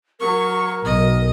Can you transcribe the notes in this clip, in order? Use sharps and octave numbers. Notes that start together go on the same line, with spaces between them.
F#3 A#4 C#6
B1 D#5